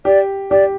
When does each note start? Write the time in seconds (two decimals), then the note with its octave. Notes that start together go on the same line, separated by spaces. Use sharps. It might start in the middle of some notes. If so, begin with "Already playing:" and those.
0.05 G4 D5
0.51 G4 D5